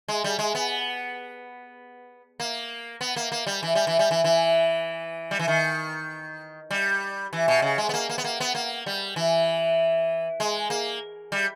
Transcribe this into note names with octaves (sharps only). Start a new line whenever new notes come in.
G#3
G3
G#3
B3
A#3
B3
A#3
A#3
G3
E3
G3
E3
G3
E3
E3
G3
E3
D#3
G3
E3
B2
C#3
G#3
B3
A#3
A#3
B3
A#3
B3
A#3
G3
E3
G#3
A#3
G3